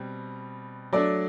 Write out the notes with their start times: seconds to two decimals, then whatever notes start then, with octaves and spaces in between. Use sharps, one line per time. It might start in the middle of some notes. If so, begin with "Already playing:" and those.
Already playing: B2 G3 C4
0.93 F#3 A3 D4 D5